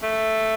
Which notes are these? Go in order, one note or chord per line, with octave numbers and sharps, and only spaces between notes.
A3